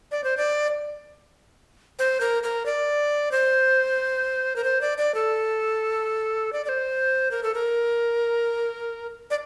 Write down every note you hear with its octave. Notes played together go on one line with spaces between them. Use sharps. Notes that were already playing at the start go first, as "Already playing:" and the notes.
D5
C5
D5
C5
A#4
A#4
D5
C5
A#4
C5
D5
D5
A4
D5
D5
C5
A#4
A4
A#4
D5